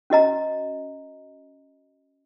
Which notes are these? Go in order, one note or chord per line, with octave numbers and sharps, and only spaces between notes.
C#4 F#4 D#5 A#5